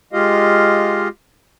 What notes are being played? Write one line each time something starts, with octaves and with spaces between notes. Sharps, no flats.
G#3 F4 G4 D#5 F5